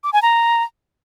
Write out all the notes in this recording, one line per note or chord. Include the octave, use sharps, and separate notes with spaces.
D6
G#5
A#5